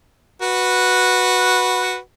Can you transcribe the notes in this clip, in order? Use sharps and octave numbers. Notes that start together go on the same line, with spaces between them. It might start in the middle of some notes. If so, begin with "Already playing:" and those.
F#4 B4